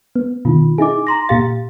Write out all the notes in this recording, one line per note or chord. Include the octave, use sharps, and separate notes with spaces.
B3
B2 D#3 F4
D#4 E4 G#4 G#5 D6
A#5 C6 A#6
A#2 G4 F5 A6